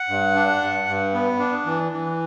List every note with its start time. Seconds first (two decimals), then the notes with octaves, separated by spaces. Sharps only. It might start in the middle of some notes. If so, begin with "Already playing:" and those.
Already playing: F#5
0.08 G2
0.35 D4
0.61 G2
0.88 G2
1.14 B3
1.39 D4
1.66 E3
1.92 E3